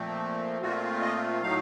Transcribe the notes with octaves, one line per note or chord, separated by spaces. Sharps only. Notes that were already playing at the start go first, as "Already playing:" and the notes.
Already playing: A#2 F3 A3 C4
A#2 A3 C4 F4 F#4
D#5
A2 F#3 A3 D#4 F5